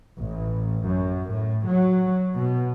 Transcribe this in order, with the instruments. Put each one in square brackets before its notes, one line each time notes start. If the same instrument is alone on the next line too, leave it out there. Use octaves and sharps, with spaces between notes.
[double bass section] A1
F#2
A2
F#3
B2